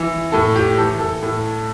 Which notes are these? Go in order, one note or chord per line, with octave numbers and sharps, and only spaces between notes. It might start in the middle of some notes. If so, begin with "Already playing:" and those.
Already playing: E3
A2 A4
G4
E3 A4
A4
A2